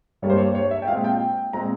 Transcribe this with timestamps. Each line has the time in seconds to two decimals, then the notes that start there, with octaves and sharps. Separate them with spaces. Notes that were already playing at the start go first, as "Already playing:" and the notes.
0.22 G2 G3 A#3 C#5
0.30 C5
0.38 C#5
0.55 C#5
0.71 E5
0.82 G5
0.88 A#2 G#3 C4 F5
1.04 G5
1.53 A#2 G#3 C4 A#5